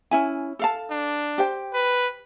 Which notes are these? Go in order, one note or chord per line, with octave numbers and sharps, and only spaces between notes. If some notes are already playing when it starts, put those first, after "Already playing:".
C#4 E4 G#5
A4 F5 A5
D4
G4 C5 G5
B4